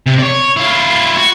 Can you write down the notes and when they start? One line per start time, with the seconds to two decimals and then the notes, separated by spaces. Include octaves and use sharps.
0.06 C3
0.19 C#5 D5
0.56 E4 F4
1.17 F#4